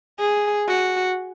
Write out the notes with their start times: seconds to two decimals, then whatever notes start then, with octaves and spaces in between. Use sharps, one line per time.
0.19 G#4
0.68 F#4